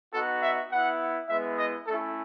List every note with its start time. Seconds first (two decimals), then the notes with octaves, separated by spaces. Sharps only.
0.13 B3 D#4 F#4 A4
0.43 E5
0.72 B3 E4 F#5
1.29 G#3 B3 E4 E5
1.58 D#5
1.87 A3 C#4 E4 A4